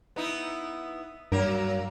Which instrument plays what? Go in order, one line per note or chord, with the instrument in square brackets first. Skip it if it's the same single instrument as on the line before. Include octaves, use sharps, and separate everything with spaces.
[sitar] B3 D#4 E4
[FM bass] G2 [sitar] F#3 A#3 A#4